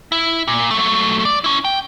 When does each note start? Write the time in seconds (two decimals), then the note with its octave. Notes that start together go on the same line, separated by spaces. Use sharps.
0.12 E4
0.48 A#2
0.71 F#3 A3
1.25 D5
1.44 C#4 E4
1.64 G5